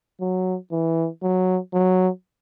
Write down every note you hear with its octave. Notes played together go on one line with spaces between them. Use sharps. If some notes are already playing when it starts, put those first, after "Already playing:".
F#3
E3
F#3
F#3